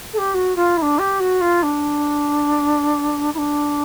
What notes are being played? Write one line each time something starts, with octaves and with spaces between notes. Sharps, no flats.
A4
G4
F#4
F4
E4
D4
G4
F#4
F4
D4
E4
D4